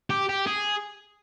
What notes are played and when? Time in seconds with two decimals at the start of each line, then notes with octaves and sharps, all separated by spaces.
0.10 G4
0.29 G4
0.46 G#4